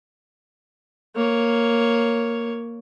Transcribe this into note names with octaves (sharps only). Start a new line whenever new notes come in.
A#3 C#5